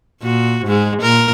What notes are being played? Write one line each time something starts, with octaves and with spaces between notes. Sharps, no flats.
A#2 F#4
G#2 G#3
A#2 A#4